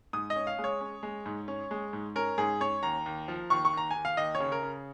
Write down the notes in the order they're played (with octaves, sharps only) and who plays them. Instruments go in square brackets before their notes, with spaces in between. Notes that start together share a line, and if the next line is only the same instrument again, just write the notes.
[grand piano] G#2 D#6
D#5
C#4
F5
G#3
C#5
C#4
G#3
G#2
C#4
G#3
G#2
C#4 A#4
G#2 G#4
C#4 C#5
D#2 A#5
D#2
F3
D#2 C#6
C#6
D#2 A#5
D#2 G#5
F5
D#2 D#5
C#5
C#3
A#4
C#3